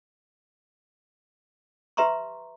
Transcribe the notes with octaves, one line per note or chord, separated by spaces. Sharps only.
G4 B4 E5 A#5 C6 C#6